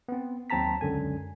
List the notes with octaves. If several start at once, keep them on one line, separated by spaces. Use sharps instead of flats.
B3 C4
D#2 F#3 C4 A5 A#5 B6
C#2 F#2 D3 G#5